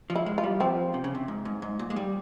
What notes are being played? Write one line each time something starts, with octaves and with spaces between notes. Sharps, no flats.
F3
E4
G#3
F4
G3
F3 C4
C3
C#3
C3
G#2
G#2
G#2
A#2
G#3
G3